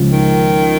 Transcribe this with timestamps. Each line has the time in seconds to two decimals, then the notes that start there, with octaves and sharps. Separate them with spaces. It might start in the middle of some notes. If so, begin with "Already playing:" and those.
Already playing: C#2 C#3 F3
0.12 D#3